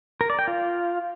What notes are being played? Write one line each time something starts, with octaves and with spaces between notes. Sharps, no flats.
A#4
D5
G5
F4